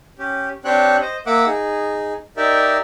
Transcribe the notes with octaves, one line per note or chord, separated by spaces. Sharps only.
C#4 G4
C4 D4 G4 C#5 G5 F#6
C5 D#5
A#3 E5 F#5 D6
D#4 G#4
D#4 G4 A#4 D5 E5